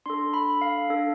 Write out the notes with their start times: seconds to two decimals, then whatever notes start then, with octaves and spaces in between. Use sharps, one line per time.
0.06 D4 A4 C6
0.34 B5
0.61 F5
0.90 D4 A4